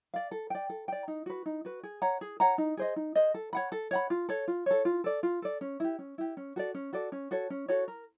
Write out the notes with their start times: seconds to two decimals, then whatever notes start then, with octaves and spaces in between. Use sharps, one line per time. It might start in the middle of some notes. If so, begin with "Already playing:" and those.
0.14 D5 F5
0.31 A4
0.50 D5 G5
0.70 A4
0.88 D5 G5
1.08 D#4
1.26 F#4 B4
1.46 D#4
1.65 F#4 B4
1.83 G#4
2.02 C#5 F#5 A#5
2.21 G#4
2.40 C#5 F#5 A#5
2.58 D#4
2.77 G#4 C5 D#5
2.96 D#4
3.15 G#4 C5 D#5
3.34 A4
3.53 C#5 F#5 B5
3.72 A4
3.91 C#5 F#5 B5
4.10 F4
4.29 A4 C#5
4.48 F4
4.66 A4 C#5
4.85 F4
5.04 A4 D5
5.23 F4
5.42 A4 D5
5.61 C#4
5.80 E4 G4
5.99 C#4
6.18 E4 G4
6.37 C#4
6.56 F#4 A4 D5
6.74 C#4
6.93 F#4 A4 D5
7.12 C#4
7.31 F#4 A4 C#5
7.50 C#4
7.68 F#4 A4 C#5
7.88 A#4